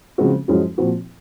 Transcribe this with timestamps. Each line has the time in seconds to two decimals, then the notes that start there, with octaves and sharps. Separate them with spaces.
0.18 C#3 F3 G#3 C4 F#4
0.48 F#2 F3 G#3 C#4 F#4
0.78 A#2 F3 C4 F#4